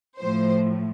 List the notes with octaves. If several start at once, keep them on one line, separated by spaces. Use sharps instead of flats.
A2 F3 C5